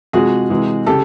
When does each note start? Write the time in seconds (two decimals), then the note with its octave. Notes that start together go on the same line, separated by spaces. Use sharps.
0.13 C3 F3 G#3 F#4 G#4
0.50 C3 E3 G#3
0.86 C#3 G4 A4